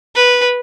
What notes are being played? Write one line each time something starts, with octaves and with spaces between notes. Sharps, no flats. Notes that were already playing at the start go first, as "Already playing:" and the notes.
B4